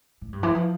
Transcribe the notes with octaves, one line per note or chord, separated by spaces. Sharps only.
A2
G2
E3
F3